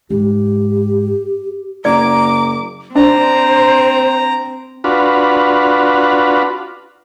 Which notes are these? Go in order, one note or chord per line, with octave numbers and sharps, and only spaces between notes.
G#2 G4
F#1 D5 A#5 D6
C4 D4 C5 A#5
D4 F4 F#4 B4